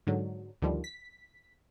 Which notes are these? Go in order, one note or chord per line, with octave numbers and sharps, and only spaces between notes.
G#2 D3 F#3
D2 D#3 F3 G3
B6